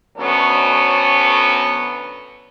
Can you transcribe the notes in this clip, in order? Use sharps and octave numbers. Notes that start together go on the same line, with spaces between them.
D2 F#3 B3 C#4 A4